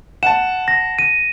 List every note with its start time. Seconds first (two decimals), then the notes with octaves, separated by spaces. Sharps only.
0.23 F#5 A5 E7
0.68 A#6
0.99 D#7